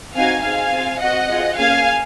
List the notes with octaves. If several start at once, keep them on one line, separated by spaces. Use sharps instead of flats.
C4 D#4 F#4 F5 G#5
C4 D#4 G#4 F5 G#5
C4 F4 G#4
C4 F#4 D#5 F#5
C4 F4 G#4
A#3 C#4 G#4 F5 G#5